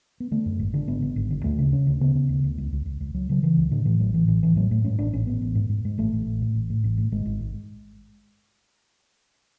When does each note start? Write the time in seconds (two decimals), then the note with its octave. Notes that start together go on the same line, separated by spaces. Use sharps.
0.20 B3
0.31 D3 A3
0.46 F#2
0.60 G#1
0.74 D3
0.88 G#1 B3
1.02 D3
1.16 G#1
1.30 D3
1.44 D2 A3
1.58 C#3
1.72 C#3 C#4
1.87 D2
2.01 C#3 B3
2.15 C#3
2.29 D2
2.44 D2
2.58 C#2
2.72 C#2
2.86 C#2
3.01 C#2
3.14 C#2 F#3
3.29 C#3 F#3
3.43 C#3 E3
3.57 C#2
3.71 A2 D3
3.85 A2 E3
4.00 A1 F#3
4.14 A2 E3
4.28 A1 E3
4.43 A1 E3
4.56 A2 F#3
4.71 A2 A3
4.85 G#2 C#4
4.99 A1 D4
5.13 A1 C#4
5.27 A1 B3
5.42 A1
5.55 G#2
5.69 G#2
5.85 G#2
5.98 A1 A3
6.13 A1
6.26 A1
6.41 A2
6.55 A1
6.70 A2
6.84 A1
6.98 A2
7.12 G#1 G#3
7.26 G#1
7.40 G#2